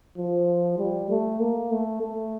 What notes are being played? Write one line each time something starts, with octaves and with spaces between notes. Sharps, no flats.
F3
G3
A3
A#3
A3
A3